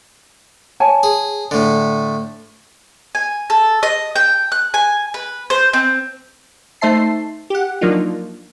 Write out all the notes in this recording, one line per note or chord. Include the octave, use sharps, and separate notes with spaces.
C#5 G#5 A5
G#4
A2 D3
G#5
A4
D#5
G5
F#6
G#5
B4
C5
C4
A3 D#4 C5 E5 A5 C7
G4 F#5
F3 F#3 A#3 D4 D#4 F4